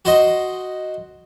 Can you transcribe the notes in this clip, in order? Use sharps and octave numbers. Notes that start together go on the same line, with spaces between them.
F#4 C5 D#5